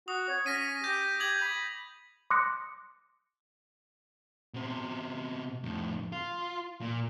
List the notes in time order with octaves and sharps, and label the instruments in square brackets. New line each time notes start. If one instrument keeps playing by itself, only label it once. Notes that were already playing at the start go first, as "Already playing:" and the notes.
[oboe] F#4 [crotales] D#6
[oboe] C#5
[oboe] C#4 [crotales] A#6 B6 D#7
[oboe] G4 [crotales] G6 A#6
[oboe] G4 [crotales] D#6 G#6 F#7
[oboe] B5
[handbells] C6 D6 D#6 F#6 A#6 C#7
[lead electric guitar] B2 C4
F2 A2
F4
A#2